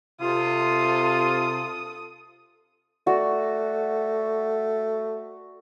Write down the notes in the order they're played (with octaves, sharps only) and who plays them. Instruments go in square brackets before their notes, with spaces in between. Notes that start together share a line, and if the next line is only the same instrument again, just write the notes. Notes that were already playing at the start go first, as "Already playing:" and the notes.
[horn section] C3 F4 [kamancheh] A4 D#6
[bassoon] A3 [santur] F#4 D5